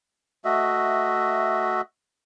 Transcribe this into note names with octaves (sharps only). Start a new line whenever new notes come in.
A3 F#4 D#5 E5